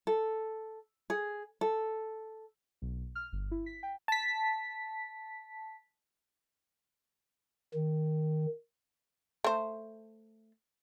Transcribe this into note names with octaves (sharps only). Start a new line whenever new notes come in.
A4
G#4
A4
B1
F6
G1
E4
B6
G5
A5 B6
D#3
A3 C5